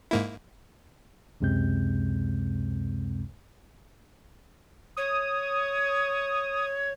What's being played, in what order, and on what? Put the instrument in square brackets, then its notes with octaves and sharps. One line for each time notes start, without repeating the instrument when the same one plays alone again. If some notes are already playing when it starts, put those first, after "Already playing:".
[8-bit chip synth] G#2 A#3 E4
[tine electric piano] C#2 F#2 C3 G#3 C4 G6
[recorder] C#5 [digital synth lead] D#6